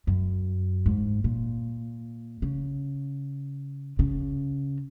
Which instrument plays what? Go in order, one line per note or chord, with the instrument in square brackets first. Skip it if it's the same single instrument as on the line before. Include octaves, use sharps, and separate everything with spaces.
[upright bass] F#2
G#2
A#2
C#3
C#3